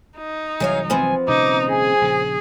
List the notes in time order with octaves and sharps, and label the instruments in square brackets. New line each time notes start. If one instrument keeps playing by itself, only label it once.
[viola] D#4
[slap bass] C2 E3 F#3 [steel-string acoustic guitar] G#4 C#5 F5
[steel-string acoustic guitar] F3 B3 C4 [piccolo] G#5
[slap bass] D#1 C3 C#4 [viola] D#4 [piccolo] D6
[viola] G#4 [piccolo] G#5
[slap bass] A#1 C#3